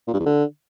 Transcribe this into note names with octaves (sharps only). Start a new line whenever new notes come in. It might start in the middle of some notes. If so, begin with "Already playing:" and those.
A#2
G2
E2
D3